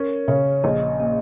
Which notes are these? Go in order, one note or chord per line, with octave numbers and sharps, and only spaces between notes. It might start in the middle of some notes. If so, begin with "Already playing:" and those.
Already playing: C#4 A#4
C#3 C#5
A#1 D#5
A#2 D#5